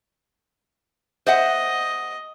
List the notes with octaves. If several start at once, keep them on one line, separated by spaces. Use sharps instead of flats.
C5 D#5 E5 F#5